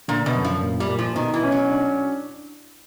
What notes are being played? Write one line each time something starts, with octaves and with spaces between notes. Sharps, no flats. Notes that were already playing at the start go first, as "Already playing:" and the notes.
A#2 D3
B2
F#2
F3
A#2
G3
A#2
F3
B2 D#3
E3
C#4
F#3
D4